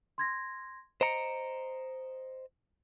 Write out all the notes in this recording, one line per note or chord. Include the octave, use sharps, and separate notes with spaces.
C6 G#6 A#6
C5 D#5 A#5 C#7 D7